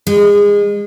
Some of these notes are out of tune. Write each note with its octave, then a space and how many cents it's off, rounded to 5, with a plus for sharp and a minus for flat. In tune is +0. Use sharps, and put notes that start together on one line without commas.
G#3 -25